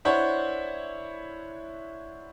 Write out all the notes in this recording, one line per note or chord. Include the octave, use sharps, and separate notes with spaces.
D4 E4 C5 C#5 F#5